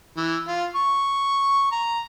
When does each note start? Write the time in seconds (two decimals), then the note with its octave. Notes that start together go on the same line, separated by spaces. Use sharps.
0.17 E3
0.47 F4
0.75 C#6
1.72 A#5